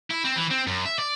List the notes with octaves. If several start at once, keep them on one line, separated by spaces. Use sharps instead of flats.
E4
C4
E3
C4
F#2
E5
D5